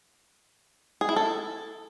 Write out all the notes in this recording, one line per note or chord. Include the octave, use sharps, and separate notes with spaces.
G#4
E4
A4